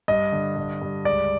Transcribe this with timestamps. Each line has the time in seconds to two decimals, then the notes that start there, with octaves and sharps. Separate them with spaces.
0.08 G2 D#5
0.32 D3
0.56 G2
0.82 G2
1.05 C#2 D5